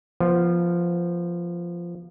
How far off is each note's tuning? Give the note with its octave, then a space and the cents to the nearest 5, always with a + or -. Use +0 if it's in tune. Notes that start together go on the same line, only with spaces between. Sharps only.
F3 -10 B3 -25